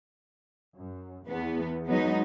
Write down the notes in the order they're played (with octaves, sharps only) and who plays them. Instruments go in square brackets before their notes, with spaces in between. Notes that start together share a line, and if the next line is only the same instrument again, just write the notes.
[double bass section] F#2
[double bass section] E2 [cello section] B3
[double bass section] F#3 G#3 [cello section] B3 D#4